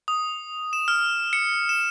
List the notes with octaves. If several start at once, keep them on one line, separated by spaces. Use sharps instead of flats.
D#6
E7
F6
C#7
E7